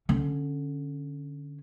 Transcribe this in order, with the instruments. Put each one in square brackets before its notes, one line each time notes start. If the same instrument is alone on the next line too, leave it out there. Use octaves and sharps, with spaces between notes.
[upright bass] D3 C#4